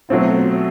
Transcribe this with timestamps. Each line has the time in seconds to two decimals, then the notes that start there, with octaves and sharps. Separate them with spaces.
0.09 B2 F#3 A3 C4 F4